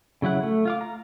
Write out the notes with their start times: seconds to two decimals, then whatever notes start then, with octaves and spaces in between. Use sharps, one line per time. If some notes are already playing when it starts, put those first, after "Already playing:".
0.22 C#3 F#3 E4 F#5
0.43 A3
0.65 F4 F5 D6
0.81 A#5